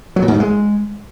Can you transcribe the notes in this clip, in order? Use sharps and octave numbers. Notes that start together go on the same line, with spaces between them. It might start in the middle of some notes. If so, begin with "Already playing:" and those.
F#3
A#2
G#2
F#3
G#3